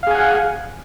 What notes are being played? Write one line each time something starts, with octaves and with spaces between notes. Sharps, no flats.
G#4 F5 F#5 G#5